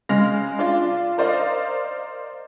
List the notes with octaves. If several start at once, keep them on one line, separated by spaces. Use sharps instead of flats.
C#3 G#3 F6 A#6 F7
D4 F4
A#4 C5 D5 D#5 F5